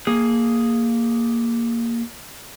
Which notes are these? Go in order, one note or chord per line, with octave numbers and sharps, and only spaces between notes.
A#3 G#4